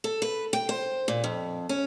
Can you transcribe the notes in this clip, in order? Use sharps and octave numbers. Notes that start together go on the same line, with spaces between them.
A4
B4
G5
C5
A#2
F2
C#4